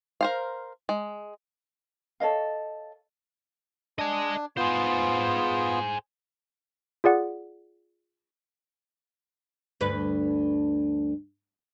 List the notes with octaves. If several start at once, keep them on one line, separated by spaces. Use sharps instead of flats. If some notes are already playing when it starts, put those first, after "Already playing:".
A#4 C5 F5
G#3
A4 C#5 D#5 F5
D4 D#5 G#5
B3 F4 G#4 C5
F4 G#4 D5 F#5
D2 G2 B4